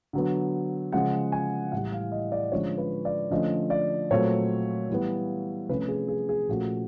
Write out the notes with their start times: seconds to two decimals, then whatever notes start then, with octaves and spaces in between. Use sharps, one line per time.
0.13 D3 F#3 B3
0.92 C#3 F3 G#3 F#5
1.32 G#5
1.72 A2 E3 G3 F#5
1.92 F5
2.12 D#5
2.32 D5
2.52 D3 F3 G#3 C#4 C#5
2.78 B4
3.05 D5
3.31 D3 F3 A3 C#4 D#5
3.70 D5
4.11 A#2 F#3 A3 C4 C#5
4.90 E3 G3 B3
5.69 C3 F3 A3 C#4 B4
5.88 G#4
6.08 G#4
6.29 G#4
6.48 A#2 F3 A3 C#4 F#4